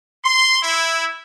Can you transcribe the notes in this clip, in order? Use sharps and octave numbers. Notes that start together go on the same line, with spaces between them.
C6
E4